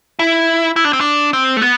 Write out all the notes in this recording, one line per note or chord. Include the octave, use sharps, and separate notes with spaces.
E4
E4
D4
C4
D4
C4
A3
B3